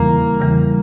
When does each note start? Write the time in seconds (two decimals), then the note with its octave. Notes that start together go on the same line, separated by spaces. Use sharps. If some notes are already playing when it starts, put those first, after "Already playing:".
Already playing: E2 C#3 E3 G3 A#3
0.40 E2 C#3 E3 G3